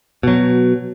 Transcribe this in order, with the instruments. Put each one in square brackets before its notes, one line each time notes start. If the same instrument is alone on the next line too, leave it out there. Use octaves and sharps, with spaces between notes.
[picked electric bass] B2 F#3